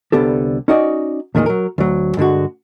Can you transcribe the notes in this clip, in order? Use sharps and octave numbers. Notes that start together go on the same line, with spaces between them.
C2 D3 B3 G4 A4
C#4 D#4 F#4 D5 D#5
E2 A#2 D#3 G#3 D#4
F#3 A#4
D2 F#3
G2 D3 G#3 F#4